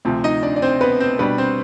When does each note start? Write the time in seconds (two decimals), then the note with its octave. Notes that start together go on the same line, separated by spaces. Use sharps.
0.05 D2 C3 F3
0.24 D#4 D#5
0.43 D4 D5
0.56 D5
0.62 C4 C5
0.81 B3 B4
1.00 C4 C5
1.19 B2 G3 B3 D4 B4
1.38 C4 C5